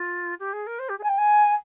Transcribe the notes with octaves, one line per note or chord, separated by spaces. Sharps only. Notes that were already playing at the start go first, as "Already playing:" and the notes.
Already playing: F4
G4
G#4
A#4
C5
G4
G#4
G#5
G5
G#5